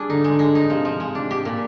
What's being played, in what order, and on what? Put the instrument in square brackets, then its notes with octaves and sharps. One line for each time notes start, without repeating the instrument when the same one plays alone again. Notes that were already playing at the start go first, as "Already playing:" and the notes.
Already playing: [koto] G3 D4 G#4
[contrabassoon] D3 [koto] D#4
[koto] G#3
G#3
D#4
[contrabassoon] C3 [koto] F3
[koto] F3
G#3
D4
G4
A#2